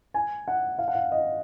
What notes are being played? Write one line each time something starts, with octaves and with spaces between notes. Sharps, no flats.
G#5
F#5
F5
F#5
F5
D#5